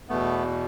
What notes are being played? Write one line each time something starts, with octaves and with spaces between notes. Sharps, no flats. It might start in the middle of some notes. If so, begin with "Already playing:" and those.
E2 B2 A3 B3